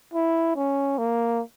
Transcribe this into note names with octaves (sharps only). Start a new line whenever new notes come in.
E4
C#4
A#3